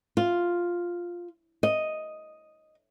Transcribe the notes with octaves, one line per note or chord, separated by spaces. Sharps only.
F4
D#5